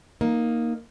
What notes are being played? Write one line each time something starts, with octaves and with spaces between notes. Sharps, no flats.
A#3 D#4